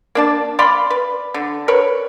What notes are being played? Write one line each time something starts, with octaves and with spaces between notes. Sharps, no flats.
A#3 D4 A5
D5 F5 B5 C6
B4
D3
A#4 B4 C#5